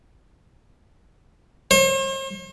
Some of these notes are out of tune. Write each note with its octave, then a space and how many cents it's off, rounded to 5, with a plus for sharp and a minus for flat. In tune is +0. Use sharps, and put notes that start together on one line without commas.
C5 +45